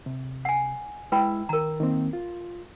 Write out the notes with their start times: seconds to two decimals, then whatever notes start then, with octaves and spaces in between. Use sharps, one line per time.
0.06 C3
0.45 F#5 G#5
1.12 G#3 E4 B4 G5 B5 E6
1.49 D#3 A#4 A#5
1.80 D#3 A#3 C4
2.13 F4